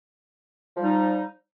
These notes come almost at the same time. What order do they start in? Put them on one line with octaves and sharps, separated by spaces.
F3 G3 D#4